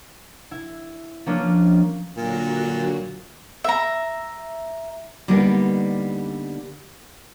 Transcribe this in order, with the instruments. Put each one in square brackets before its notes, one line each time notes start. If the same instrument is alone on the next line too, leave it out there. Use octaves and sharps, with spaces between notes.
[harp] E4
F3 A#3 C#4 D4 F4
[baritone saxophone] A#2 [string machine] D3 F#3 F#4
[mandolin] E5 A#5
[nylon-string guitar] D3 G3 A#3 B3 D#4 G4